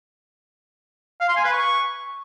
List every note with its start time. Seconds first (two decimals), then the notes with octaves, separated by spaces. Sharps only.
1.20 F5
1.28 C6
1.37 G#5
1.45 B4
1.53 C#6